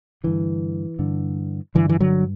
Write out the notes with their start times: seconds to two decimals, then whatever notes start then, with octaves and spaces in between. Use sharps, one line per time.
0.24 G2 D3 E3
0.99 G2 D3
1.75 G2 D3 E3
1.89 E3
2.00 D3 F#3